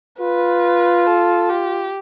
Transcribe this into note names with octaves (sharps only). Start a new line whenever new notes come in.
F4 B4
A4
G4